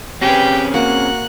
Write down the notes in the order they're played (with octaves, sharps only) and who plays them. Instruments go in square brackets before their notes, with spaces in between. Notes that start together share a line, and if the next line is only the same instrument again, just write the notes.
[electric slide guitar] C4 C#4 G#4 [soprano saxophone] G4 [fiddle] B4 G5
[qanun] A#3 C#5 F#5 [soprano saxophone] F#4 [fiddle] F#6